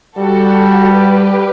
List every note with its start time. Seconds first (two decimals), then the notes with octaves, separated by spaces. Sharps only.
0.17 G3 F#4 A4
0.93 G4 B4